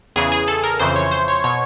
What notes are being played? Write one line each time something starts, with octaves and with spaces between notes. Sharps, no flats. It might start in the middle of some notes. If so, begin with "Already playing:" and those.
E2 C#3 E3 G#4
G#4
A4
A#4
F2 C#3 E3 C5
C#5
C5
C#5
B2 C#5